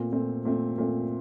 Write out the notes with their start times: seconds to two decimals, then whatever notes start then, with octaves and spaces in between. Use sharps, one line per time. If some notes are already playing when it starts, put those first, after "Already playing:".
Already playing: A#2 A3 C4
0.12 A#2 A3 C4
0.45 A#2 A3 C4
0.78 A#2 A3 C4